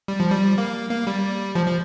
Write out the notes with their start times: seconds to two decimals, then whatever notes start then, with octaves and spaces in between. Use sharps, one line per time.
0.08 G3
0.20 F3
0.30 G3
0.58 A#3
0.90 A#3
1.07 G3
1.55 F3
1.67 F3